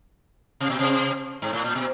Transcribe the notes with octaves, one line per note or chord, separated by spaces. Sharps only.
C3
B2
C3
G#2
A2
A#2
B2